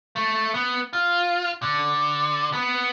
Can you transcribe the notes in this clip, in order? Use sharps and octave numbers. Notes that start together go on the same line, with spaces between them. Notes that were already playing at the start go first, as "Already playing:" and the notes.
A3
B3
F4
D3
B3